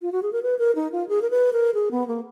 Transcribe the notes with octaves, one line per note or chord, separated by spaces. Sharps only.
F4
F#4
G#4
A#4
B4
A#4
D#4
F4
G#4
A#4
B4
A#4
G#4
B3
A#3